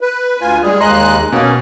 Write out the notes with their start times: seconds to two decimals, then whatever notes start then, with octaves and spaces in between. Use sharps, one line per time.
0.01 B4
0.41 D2 F4 G#5
0.63 G3 G#3 G#4
0.81 D#2 G#3 D#5 A#5 C6 F#6
1.32 B2 A#3 C#4